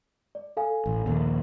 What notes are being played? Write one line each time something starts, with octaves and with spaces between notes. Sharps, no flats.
D5
A4 F5 G#5
A1
A#1 D#2